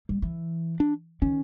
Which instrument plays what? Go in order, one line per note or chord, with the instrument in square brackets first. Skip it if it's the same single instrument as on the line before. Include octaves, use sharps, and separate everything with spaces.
[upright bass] G3
E3
[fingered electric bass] D4
[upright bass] D#3 [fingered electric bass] C#4